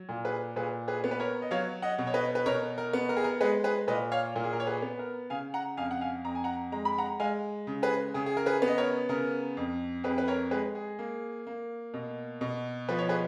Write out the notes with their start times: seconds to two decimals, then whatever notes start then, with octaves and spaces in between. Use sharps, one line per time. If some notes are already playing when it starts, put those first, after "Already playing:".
Already playing: F#3
0.09 A#2
0.25 G#4 B4
0.56 A#2 G#4 B4
0.88 G#4 B4
1.04 B3
1.11 B4
1.20 A#4 C#5
1.42 D#5
1.51 F#3 C#5 F5
1.82 D#5 F#5
1.98 B2
2.07 C#5
2.14 B4 D#5
2.35 B4
2.46 B2 A#4 C#5
2.78 A#4
2.93 B3
3.09 A#4
3.17 G#4
3.24 A#4
3.41 G#3 G#4 B4
3.64 G#4 B4
3.88 A#2 B4 D#5
4.12 C#5 F5
4.36 A#2 A#4
4.44 G#4
4.53 A#4
4.60 C#5
4.67 G#4 B4
4.82 B3
4.99 A#4
5.30 C#3 F5 G#5
5.54 F#5 A#5
5.77 F2 F5 G#5
5.91 F#5
6.01 F5 G#5
6.24 F2 A#5
6.35 G#5
6.44 F#5 A#5
6.72 G#3 A#5
6.85 B5
6.98 F#5 A#5
7.20 G#3 F5 G#5
7.67 C#3
7.83 G#4 B4
8.14 C#3 G#4
8.26 G#4
8.37 A#4
8.46 G#4 B4
8.62 B3
8.68 D#5
8.78 A#4 C#5
9.09 C#3 A#4
9.57 F2
10.04 F2 G#4 B4
10.18 B4
10.28 A#4 C#5
10.51 G#3 G#4 B4
10.75 G#4
10.99 A#3
11.47 A#3
11.94 B2
12.41 B2
12.88 F3 B4
12.99 C#5
13.09 G#4 B4